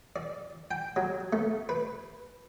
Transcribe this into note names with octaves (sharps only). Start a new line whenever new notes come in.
D5
G5
F#3
A3
B4